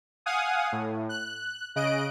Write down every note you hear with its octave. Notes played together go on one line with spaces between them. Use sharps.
F5 F#5 G#5 D#6
A2
F#6
C#3 D#5 F#6 D7